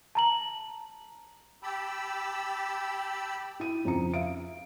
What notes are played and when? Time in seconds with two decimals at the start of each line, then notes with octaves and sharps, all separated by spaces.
0.15 A5 A#5 F#7
1.63 G4 G5 A5 B5 E6
3.60 E4 D#7
3.85 F2 C#3 A#5 C#7
4.14 E5 F5 D7